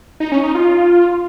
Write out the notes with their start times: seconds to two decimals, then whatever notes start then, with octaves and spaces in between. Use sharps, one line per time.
0.20 D#4
0.32 C#4
0.43 D#4
0.55 F4